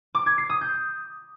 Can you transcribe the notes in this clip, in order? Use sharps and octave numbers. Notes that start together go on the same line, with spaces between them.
D6
G#6
C7
D#6
G6